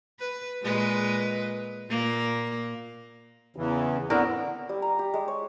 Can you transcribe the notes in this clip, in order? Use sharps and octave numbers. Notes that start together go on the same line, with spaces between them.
B4
A#2 G#3 B4
A#2 A#3
E2 C#3 E3
A2 D3 B3 C4 A#4
G3
A#5
G4
G#3
C#5